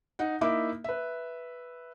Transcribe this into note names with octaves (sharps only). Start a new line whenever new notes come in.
D#4 F#5
A#3 D#4 E4 E5 D6
B4 E5